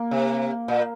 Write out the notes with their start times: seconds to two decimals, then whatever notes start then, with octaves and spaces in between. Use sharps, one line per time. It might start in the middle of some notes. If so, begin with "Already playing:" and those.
Already playing: A#3
0.11 C3
0.68 A#2